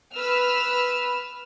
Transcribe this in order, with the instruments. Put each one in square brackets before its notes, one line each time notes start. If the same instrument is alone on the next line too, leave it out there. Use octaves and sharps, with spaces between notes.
[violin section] B4 E6 F6